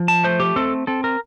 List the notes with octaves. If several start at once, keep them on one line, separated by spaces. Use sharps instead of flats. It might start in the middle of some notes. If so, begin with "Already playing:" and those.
Already playing: F3
A5
A3 C5
G4
C4 A4
C4 A4
A#4